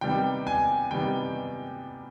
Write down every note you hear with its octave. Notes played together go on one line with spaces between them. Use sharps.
C3 D#3 G3 B3 G5
G#5
C3 D#3 G3 B3 G5